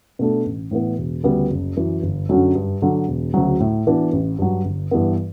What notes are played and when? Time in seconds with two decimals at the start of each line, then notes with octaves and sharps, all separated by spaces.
0.19 B2 A3 D4 A4
0.46 A1
0.71 A2 E3 B3
0.98 E1
1.24 D2 C#3 G3 B3
1.50 F#1
1.77 F#2 E3
2.03 G1
2.29 F#2 D3 F#3 C#4
2.55 G2
2.82 D3 F#3
3.08 E1
3.34 D2 C#3 F#3
3.60 A2
3.87 E3 B3 D4 F#4
4.12 A1
4.39 G2 F#3
4.65 G1
4.91 G2 E3 B3